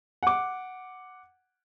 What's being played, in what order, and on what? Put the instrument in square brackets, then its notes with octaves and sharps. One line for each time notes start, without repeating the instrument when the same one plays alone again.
[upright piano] F#5 D6